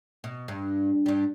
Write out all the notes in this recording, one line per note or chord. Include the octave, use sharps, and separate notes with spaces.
B2
G2
G2 G3